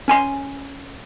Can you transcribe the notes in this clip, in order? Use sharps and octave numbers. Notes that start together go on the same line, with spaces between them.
C#4 G#5 C6